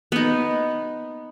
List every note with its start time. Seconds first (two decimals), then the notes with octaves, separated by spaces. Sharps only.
0.12 B3 D#4